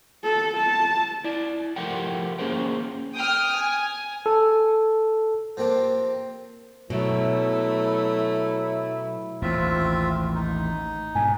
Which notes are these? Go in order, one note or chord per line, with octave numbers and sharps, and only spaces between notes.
A4
A5
E4 D5
F3 A3 G4 A#4 F#5 G5
A#3 C#4 G#4 A#4 C5 G5
G5 D#6 F6
G#5
A4
F3 A#3 C4 D4 G4
B2 F#3 A3 E4
A1 D#2 C4 F4 E5
D#4
G#2 B2 G#5